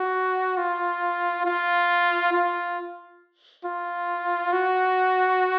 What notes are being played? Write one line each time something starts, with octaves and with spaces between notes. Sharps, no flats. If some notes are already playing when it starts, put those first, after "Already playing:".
Already playing: F#4
F4
F4
F4
F4
F#4